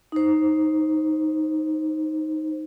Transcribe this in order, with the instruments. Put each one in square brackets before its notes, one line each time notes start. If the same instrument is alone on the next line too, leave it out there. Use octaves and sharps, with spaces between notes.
[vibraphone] D#4 C5